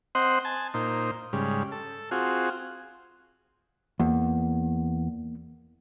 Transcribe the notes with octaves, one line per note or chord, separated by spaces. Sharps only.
C4 C5 D#5 F#5 C6
G#5 A5
A#2 D#4 C5
G#2 C#3 G3
A4
C4 F4 F#4 G#4
E2 A#3